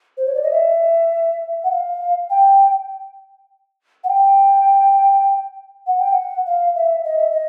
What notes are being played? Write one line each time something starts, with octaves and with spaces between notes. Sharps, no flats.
C5
C#5
D5
D#5
E5
F#5
F5
G5
F#5
G5
F#5
G5
F#5
F5
E5
D#5
E5
D#5